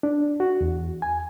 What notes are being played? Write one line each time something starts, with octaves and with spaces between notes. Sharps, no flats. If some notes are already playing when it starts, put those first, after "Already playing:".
D4
F#4
E2
G#5